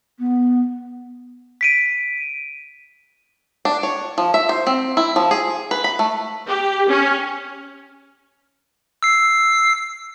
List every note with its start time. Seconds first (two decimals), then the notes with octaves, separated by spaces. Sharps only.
0.19 B3
1.61 B6 D7 D#7
3.65 D4
3.83 C#5
4.18 F3
4.34 E5
4.49 C5
4.67 C4
4.97 E4
5.16 F3
5.31 G#4
5.71 B4
5.84 B5
5.99 A3
6.48 G4
6.89 C#4
9.03 E6 C7